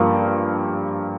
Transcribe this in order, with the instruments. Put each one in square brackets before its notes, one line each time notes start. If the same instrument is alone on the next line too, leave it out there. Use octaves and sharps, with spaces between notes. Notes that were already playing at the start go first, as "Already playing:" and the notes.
Already playing: [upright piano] G2 F3 A#3